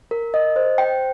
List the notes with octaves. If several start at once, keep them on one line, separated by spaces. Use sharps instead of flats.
A#4
D#5
C5
G5